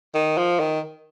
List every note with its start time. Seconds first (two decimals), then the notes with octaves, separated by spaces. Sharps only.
0.15 D#3
0.38 F3
0.60 D#3